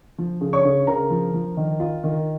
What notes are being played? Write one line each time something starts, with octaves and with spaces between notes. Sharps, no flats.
F3
C#3
C#5 C#6
C#3
C#3 A#4 A#5
F3
F3
D#3
F4
D#3